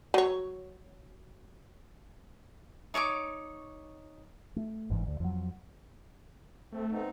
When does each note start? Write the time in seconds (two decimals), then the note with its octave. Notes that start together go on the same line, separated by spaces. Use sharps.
0.14 F#3 C#5
2.94 D#4 C#5 C#6 D6
4.56 A3
4.90 G1 G#2 E3
5.07 D2
5.20 F2 F#3
6.72 A3 C4
6.91 B3 C4 D#4